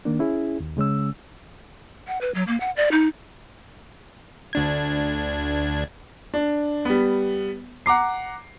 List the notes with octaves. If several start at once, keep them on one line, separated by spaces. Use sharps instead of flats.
D#3 A#3 D4
C#4 E4 G#4
D#2
C#3 G#3 C#4 E6
F#5
B4
F#3
A#3
F#5
D5
D#4
D2 D4 G#6
D4
G3 B3
F#5 A#5 D6 C7